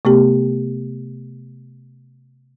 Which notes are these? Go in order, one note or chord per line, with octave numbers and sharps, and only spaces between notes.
C3 A3 B3 G4